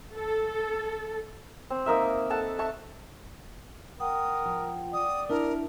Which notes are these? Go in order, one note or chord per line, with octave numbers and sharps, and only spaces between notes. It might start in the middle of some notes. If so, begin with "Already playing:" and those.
A4
C4
A#3 D#4 A#4 E5
A4 F#5 A5
E5 A5 C#6
A#4 F#5 G5 D#6
F3
D5 D#6
D4 E4 A#4 E5